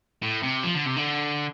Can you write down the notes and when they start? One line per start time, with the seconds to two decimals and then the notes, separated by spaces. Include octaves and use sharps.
0.22 A2
0.43 C3
0.63 F3
0.75 D3
0.86 C3
0.96 D3